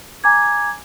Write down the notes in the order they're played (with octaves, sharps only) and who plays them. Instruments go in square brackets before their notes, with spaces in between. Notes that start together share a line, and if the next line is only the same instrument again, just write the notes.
[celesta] G#5 A#5 D6 G#6